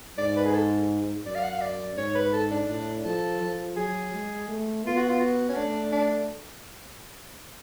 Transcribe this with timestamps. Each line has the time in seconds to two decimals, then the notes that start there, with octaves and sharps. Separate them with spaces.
0.18 G#2 D5
0.37 B4
0.46 G#4
0.54 A4
1.26 F#2 D5
1.35 F5
1.44 F#5
1.52 F5
1.61 D5
1.98 G#2 C#5
2.15 B4
2.33 A4
2.51 D4
2.69 A2 D4
3.05 F3 A4
3.41 F3
3.76 F#3 G#4
4.13 G#3
4.49 A3
4.84 B3 F4
4.97 F#4
5.09 F4
5.20 F#4
5.49 C#4
5.56 A3 D4
5.92 D4